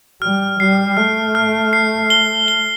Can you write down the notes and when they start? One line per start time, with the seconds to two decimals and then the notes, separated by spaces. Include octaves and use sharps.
0.22 G3 F6
0.60 G3 C7
0.97 A3 F6
1.35 F6
1.73 C7
2.10 G7
2.48 G7